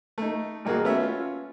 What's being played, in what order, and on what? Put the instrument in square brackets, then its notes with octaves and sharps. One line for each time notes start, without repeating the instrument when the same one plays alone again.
[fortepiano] A3 D#4
G#1 G2 A#3 F#4 G#4 F#5
A3 B3 C#4 F#4 E5
C#4 F4